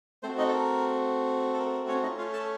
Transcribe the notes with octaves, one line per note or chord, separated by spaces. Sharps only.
A3 C4 F#4 C5
D#4 D#5
A4
A#4
A4
A#4
A#4
C#4 C#5
A3 C#4 D#4 F4 D#5
F4 F5
A4 A5